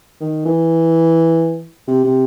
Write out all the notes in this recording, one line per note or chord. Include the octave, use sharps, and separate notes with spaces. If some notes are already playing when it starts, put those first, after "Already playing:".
D#3
E3
C3
C3